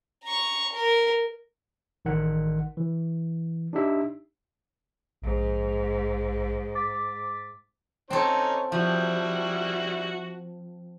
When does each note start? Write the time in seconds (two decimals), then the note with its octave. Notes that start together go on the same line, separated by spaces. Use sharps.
0.24 A#5 C#6
0.72 A#4
2.05 A1 D#3 F#5
2.77 E3
3.73 D4 D#4 G4 E5
5.22 A#1 G#2
6.75 D6 A6 B6
8.10 C4 C#4 D#4 A4 C#5
8.72 F3 G3 E4 F#4